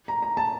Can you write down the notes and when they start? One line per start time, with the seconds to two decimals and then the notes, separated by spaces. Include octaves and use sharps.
0.08 A#5
0.22 A#5
0.37 A5